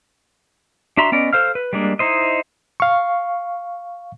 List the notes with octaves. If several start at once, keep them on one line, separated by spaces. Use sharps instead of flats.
D4 F#4 E5 A#5 C6
B3 C#4 D5 D#5
A4 C5 F5 F6
B4
G3 G#3 A#3 D4
D#4 E4 C5 D#5
F5 C#6